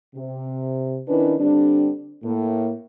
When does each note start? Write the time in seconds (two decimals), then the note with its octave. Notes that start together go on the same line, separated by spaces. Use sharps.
0.16 C3
1.08 D#3 C#4 D4 E4 B4
1.39 D3 G3 C4 D4
2.24 A2 A#3